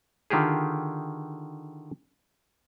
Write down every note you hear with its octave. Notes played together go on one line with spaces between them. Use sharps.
D3 D#3 F4 G4 G#4